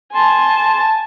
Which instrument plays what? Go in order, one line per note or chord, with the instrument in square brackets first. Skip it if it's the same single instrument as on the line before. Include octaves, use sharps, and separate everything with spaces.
[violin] G#5 A5 [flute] C6